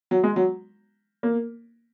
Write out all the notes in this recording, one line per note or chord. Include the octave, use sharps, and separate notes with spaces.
F#3
G#3
F#3
A#3